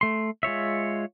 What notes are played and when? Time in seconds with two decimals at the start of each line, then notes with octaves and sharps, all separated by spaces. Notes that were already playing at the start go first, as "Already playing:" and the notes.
0.01 A3 C6
0.43 G#3 F4 C#5 E5